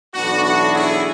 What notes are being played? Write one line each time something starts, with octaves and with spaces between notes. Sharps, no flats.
B1 A2 E3 B3 D4 F#4
F#4
E4 G#4